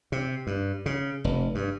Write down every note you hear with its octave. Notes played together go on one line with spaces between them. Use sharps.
C3
G2
C#3
F1
G2